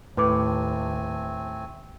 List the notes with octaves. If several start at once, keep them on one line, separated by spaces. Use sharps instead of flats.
D#2 A2 A3 C4 B4 G#5 D6